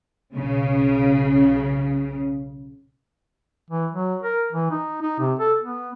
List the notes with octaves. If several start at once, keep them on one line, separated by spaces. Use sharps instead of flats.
B1 C#3
E3
F#3
A#4
E3
D#4
D#4
C3
A4
B3